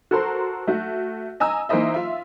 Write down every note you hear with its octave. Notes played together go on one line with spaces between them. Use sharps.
F#4 A4 A#4 C5 C6
A3 F#4
D#5 G#5 A#5 E6
E3 A#3 D#4 C5 D#5 E5
F4 E5